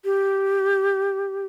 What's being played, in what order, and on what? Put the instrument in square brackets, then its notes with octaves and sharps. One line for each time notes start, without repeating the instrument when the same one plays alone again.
[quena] G4